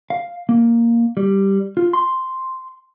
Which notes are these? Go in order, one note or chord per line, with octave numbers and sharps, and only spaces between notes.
F5
A#3
G3
F4
C6